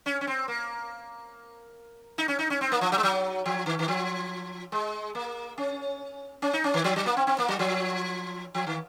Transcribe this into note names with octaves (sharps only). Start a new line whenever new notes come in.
C#4
C#4
C4
A#3
D#4
C#4
D#4
C#4
C4
A#3
F3
F#3
G#3
F#3
F3
D#3
D#3
F3
G#3
A#3
C#4
C#4
D#4
C#4
D#3
F3
F#3
A#3
C4
C4
A#3
F#3
F3
F3
D#3